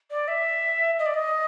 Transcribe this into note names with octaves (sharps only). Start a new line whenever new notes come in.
D5
E5
D#5
D5
D#5